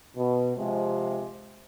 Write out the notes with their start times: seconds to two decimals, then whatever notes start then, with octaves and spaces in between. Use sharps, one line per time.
0.15 B2
0.56 C3 F3 G#3